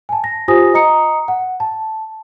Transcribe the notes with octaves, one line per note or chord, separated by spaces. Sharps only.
G#5 A5
A#6
F4 G4 C5 G#5 D#6 A#6
D#5 A#5 D#6 C#7
F#5
A5